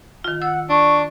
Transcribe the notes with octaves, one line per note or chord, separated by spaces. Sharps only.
D#3 F4
F#5 E6
D4 C#6